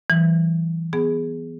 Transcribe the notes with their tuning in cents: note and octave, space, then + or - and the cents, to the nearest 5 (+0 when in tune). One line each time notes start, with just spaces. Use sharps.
E3 +0 G3 -40
B3 +0 G#4 +0